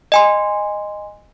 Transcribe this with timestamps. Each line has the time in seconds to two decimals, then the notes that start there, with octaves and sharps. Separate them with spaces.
0.12 D#5 G#5 C6